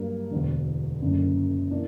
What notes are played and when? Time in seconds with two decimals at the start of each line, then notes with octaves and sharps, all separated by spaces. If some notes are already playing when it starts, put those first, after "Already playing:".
Already playing: G2 F#3 A#3 D4
0.31 E1 D2 D3
1.02 F#1 F#2 D3
1.71 E3 A#3 D4